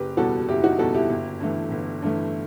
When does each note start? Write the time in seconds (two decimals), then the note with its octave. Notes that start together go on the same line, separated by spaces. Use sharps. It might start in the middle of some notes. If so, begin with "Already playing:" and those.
Already playing: F#1 G4 B4
0.17 E2 B2 G3 F#4 A4
0.48 F#1 E4 G4
0.63 D#4 F#4
0.79 E2 B2 G3 F#4 A4
0.94 E4 G4
1.10 G1
1.40 G2 E3 A3
1.71 G1
2.02 G2 E3 A3